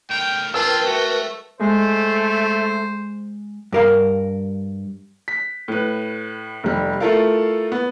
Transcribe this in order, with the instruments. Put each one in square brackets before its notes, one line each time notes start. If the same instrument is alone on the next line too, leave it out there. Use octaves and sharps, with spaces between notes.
[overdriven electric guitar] A2 A#4 [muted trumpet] G5
[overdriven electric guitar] C4 D4 [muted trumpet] F4 [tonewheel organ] A#4 B4 G5 [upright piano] A5 E6
[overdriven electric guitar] A3 [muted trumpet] F#4
[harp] G#3 [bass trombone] A3 [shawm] C5
[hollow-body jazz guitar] G2 A#4 F5
[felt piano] B6
A2 B4
F1 G3
A3 E4 F4 A4 A#4 F5
B3